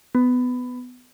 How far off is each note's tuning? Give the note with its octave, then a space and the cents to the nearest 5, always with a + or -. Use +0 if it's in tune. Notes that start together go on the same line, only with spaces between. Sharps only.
B3 +15